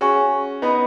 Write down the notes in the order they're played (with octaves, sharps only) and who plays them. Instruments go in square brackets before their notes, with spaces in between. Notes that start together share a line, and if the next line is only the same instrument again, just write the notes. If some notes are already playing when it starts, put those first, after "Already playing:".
[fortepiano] C#4 F#4 [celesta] G#4 C#5 G#5 C#6
[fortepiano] B3 D#4 [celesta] B4 D#5 B5